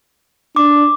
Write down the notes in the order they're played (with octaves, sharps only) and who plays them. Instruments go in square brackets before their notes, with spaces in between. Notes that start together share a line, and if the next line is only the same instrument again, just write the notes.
[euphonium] D4 [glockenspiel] D6